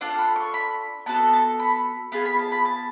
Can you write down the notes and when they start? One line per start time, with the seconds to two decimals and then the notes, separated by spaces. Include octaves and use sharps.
0.01 D4 F4 A4 F#5
0.18 B5
0.36 C#6
0.54 B5
1.06 B3 F#4 A4 A5
1.33 A5
1.60 B5
2.12 B3 F4 G#4 B5
2.25 B5
2.39 A5
2.52 B5
2.65 A5